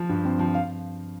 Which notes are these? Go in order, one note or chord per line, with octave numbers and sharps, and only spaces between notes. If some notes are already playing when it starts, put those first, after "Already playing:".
Already playing: F3
G2
C4
F3
F5